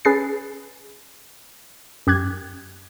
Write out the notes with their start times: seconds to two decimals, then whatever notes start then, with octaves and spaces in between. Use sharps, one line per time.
0.05 C#4 G#4 B4 A6 C7
2.07 F#2 G4 F#6 G#6